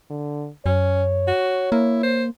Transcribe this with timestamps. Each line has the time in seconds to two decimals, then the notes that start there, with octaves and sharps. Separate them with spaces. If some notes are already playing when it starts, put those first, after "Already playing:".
0.10 D3
0.66 F#2 C#4 C#5
1.27 F#4
1.72 A#3 E4
2.03 C5